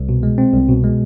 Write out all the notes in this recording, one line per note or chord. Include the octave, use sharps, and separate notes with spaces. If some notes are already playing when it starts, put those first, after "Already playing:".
Already playing: C2
B2
G#3
C4
C2
B2
G#3